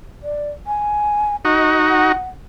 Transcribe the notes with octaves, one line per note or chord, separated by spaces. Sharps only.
D5
G#5
D#4 F#4 D#5
F#5